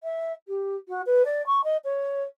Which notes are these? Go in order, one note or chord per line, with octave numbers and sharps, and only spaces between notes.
E5
G4
F#4
B4
D5
C#6
D#5
C#5